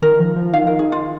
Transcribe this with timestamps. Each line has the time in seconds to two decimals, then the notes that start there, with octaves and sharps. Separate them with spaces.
0.02 D#3 A#4
0.19 F3
0.36 F3
0.53 D#3 F5
0.67 A#4
0.79 D#3 G#4
0.92 F4